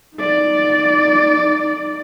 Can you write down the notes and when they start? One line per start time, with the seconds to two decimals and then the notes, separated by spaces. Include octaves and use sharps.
0.16 D#4 D5